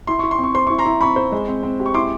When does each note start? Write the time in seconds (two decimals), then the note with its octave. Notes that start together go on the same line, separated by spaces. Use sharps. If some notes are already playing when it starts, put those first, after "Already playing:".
0.07 E4 C6
0.19 E4 C#6
0.31 C6
0.38 C4
0.44 C#6
0.55 C5 C6
0.67 E4 C#6
0.78 A#5 C6
0.85 E4
1.01 C4 B5 C#6
1.16 C5
1.32 G#3
1.48 C4
1.63 C4
1.80 G4
1.86 C#6
1.94 E4 C6 D6